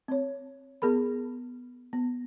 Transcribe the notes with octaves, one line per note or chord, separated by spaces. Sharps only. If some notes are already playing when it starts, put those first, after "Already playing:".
C4 C#5
B3 G#4 A#4 B5
B3